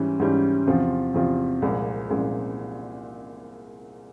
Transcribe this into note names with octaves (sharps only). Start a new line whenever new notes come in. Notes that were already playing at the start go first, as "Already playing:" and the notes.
Already playing: G#2 E3 G3 C#4
G#2 E3 G3 C#4
E2 C3 F3 C4 F4
E2 C3 F3 C4 F4
C2 A#2 F3 G#3
C2 A#2 F3 G#3